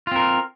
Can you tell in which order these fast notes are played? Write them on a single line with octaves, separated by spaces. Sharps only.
F4 C4 A#4